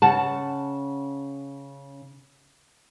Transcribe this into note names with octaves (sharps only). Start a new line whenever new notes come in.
C#3 F#5 A5